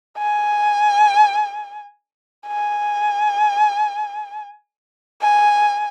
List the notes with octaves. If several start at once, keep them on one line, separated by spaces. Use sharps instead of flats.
G#5
G#5
G#5